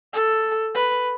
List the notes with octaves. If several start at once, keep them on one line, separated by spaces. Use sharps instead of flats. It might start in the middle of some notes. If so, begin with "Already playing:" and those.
A4
B4